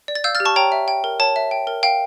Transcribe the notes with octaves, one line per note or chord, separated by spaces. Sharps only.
D5
A6
F5 E6 G6
F6 A6
G4
A5 C#6
C#5 G5 A#5
E5
G5
A#4
C#5 A5
E5
G5
A#4
F5 G5